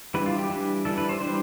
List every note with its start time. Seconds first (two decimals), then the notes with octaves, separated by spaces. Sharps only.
0.14 E3 G3 D4 B4
0.26 F4
0.38 G4
0.50 E3 G3 D4
0.85 E3 G3 D4 A4
0.98 B4
1.09 C5
1.20 E3 G3 D4 C5